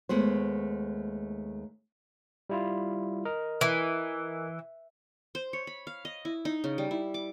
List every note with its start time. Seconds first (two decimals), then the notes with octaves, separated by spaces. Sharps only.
0.09 D#2 G#3 A3 B3 C5
2.50 G3 E4 F4
3.25 A#4 D#5
3.61 E3
5.35 C5
5.53 C#5
5.67 B5
5.87 F5
6.05 D#5
6.25 E4
6.45 D#4
6.64 C#3
6.78 G3
6.91 E4
7.14 D6